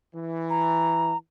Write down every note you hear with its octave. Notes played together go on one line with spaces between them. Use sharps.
E3
A#5